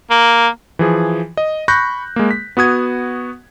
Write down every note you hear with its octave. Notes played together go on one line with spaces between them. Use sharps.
A#3
E3 F3 G#4
D#5
B5 C#6 F#6 G6 A#6
G#3 A#3
B6
B3 F#4 D#6 G#6